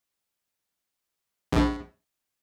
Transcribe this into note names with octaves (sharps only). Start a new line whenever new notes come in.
A#1